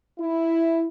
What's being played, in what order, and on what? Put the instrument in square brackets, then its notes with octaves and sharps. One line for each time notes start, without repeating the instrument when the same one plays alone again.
[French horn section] E4